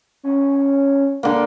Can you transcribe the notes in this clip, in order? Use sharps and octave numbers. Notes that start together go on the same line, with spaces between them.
C#4
D3 A#3